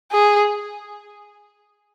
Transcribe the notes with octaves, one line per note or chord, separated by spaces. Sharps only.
G#4